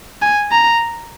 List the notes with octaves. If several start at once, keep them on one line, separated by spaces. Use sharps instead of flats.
G#5
A#5